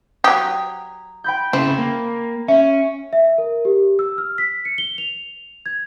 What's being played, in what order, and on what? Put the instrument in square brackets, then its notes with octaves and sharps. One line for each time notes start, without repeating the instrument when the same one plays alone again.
[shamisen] F#3 G4 [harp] A#5 G#6 [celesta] D#6
[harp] G5 B5 G6
[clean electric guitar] C#3 E4 [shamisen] C4
[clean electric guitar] A#3
[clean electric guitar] C#4 [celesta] E5
[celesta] E5
A#4
G4
E6
F6
B6
C#7
G7
F7
G#6